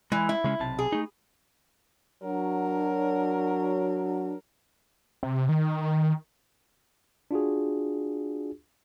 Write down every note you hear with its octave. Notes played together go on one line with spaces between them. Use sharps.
E3 G#3
E4
C#3 G#3 C#4
B1 C3 A5
G#4
A3 D#4
F#3 D4 A#4
C3
D#3
D4 F4 F#4 G#4